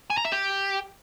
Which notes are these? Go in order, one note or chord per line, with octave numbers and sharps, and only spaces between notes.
G#5
A#5
E5
G4